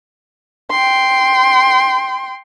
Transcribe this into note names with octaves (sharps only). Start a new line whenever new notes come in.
G5 C6